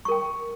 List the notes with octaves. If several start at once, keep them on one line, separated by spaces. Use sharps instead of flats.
A#4 G5 C#6